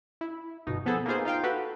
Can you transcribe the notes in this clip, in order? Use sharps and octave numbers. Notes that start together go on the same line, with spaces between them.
E4
G1 B2 D#4
F3 B3 G#4 A4 C5
A#3 B3 D#4 F4 G#4 C5
D#4 F4 F5 G5
F#4 G4 A4 B4